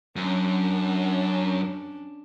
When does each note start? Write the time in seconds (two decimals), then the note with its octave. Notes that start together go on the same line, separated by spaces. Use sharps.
0.16 F#2 C#4 D4